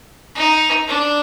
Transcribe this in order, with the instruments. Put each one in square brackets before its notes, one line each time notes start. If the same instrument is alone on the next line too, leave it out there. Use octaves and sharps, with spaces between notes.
[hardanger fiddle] D#4
D4